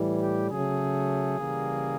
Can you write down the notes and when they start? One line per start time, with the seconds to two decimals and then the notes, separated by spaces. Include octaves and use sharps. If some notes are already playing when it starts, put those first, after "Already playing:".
Already playing: A2 E3 G3
0.21 G4
0.50 C#3 F#3 A3 G#4
1.39 C#3 E3 G3 A#3